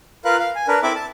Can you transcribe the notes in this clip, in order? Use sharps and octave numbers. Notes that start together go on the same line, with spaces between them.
F4 A#4 B4 F5 F#6
F5
G#5
D4 A#4 B4
C4 E4 A4 E5 B5 D6
A5